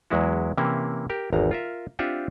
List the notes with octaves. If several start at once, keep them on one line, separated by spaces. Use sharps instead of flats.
E2 F#3 G#3 E4 F#4
C3 E3 A#3 C#4 E4
G4 A#4
G#1 E2 A#5
F4 A#4 E5
C4 D4 F4 G4 E5 F#5